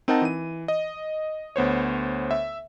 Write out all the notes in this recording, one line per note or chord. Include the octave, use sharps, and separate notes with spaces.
C4 D#4 A#4 D#5 F#5 A5
E3 D#7
D#5
D2 B3 C5 C#5
E5